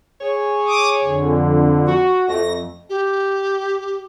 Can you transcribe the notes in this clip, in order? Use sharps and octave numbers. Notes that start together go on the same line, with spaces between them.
G#4 C#5
D6 D#6
F2 D3
F#4
F2 A3 A#6
G4